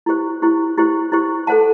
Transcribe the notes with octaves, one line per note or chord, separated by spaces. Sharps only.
E4 G4 C5
E4 G4 C5
E4 G4 C5
E4 G4 C5
A4 C5 F#5 A5